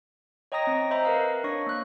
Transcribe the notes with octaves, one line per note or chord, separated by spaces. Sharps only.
C#5 D#5 G5 A#5 D#6 A#6
C4
C5 D#5 E5 A#5 B5
A#4 B4 F5
D4 C#5 C#6 A#6
A#3 F#6